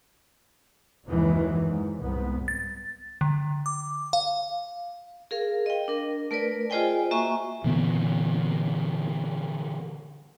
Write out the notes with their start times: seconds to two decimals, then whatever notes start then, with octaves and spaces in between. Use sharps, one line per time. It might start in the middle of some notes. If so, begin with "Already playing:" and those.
1.07 F#1 D#2 G#2 D#3 E3 F#3
1.68 G#2
1.99 C2 G#2 B3
2.48 A6
3.21 D3
3.66 D6
4.13 F5
5.31 G#4 A#4 F5
5.66 D#5 G5
5.88 D4 A#4
6.31 A3 A#4 B4 D5
6.70 F4 G#4 C5 D#5 G5 G#5
7.11 A#3 F#4 E5 G#5 C#6
7.64 A#2 D3 E3 B3